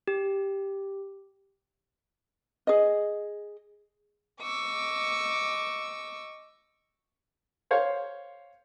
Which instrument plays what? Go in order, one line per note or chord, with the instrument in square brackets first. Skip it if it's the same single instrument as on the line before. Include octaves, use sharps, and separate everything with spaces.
[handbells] G4
[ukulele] G#4 D#5
[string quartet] D#5 C#6 D6 E6
[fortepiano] C5 C#5 F5